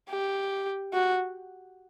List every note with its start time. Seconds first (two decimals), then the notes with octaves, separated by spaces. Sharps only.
0.10 G4
0.93 F#4